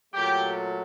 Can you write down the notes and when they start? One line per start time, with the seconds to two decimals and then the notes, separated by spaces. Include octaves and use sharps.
0.13 A#2 F#3 A3 G4